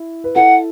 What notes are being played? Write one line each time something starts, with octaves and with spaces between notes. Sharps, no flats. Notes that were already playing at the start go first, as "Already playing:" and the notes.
Already playing: E4
B4
E4 A4 F#5